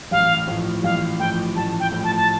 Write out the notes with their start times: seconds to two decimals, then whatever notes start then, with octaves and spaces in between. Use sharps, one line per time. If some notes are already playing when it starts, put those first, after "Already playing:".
0.11 A1 F5
0.47 A2 F3
0.83 A1 F5
1.19 A2 F3 G5
1.56 A1 A5
1.80 G5
1.92 A2 F3
2.04 A5
2.16 A5